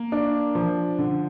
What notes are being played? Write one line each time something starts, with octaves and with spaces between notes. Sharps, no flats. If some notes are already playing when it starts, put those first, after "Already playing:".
Already playing: A#3
D4
F3
D3